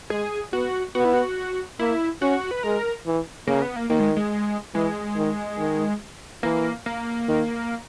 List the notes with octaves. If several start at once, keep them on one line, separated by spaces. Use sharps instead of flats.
G#3 G#4
B3 F#4
B3 F#4
E4
F#4
A#3 E4
C#4 F#4
B4
G#3 A#4
E3
C#3 A#3
B3
A#3
D#3 A#3
G#3
G#3
E3 G#3
D#3
D#3
E3 A#3
A#3
D#3